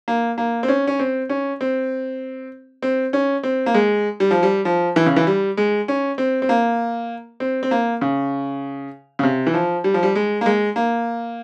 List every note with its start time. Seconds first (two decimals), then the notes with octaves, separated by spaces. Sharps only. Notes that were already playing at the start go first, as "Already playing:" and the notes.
0.08 A#3
0.38 A#3
0.63 C4
0.68 C#4
0.87 C#4
0.99 C4
1.29 C#4
1.61 C4
2.82 C4
3.13 C#4
3.43 C4
3.66 A#3
3.74 G#3
4.20 G3
4.31 F3
4.43 G3
4.65 F3
4.96 E3
5.06 C#3
5.16 E3
5.27 G3
5.57 G#3
5.88 C#4
6.18 C4
6.42 C4
6.49 A#3
7.40 C4
7.63 C4
7.71 A#3
8.01 C#3
9.19 C#3
9.23 C3
9.47 E3
9.54 F3
9.84 G3
9.94 F3
10.03 G3
10.15 G#3
10.41 A#3
10.46 G#3
10.76 A#3